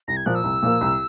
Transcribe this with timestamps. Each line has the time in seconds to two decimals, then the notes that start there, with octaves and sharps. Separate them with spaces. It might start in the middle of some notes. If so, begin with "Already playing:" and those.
0.08 C2 A#6
0.17 G#6
0.26 A#2 F3 A#3 F#6
0.35 E6
0.44 C2
0.63 A#2 F3 A#3
0.81 C2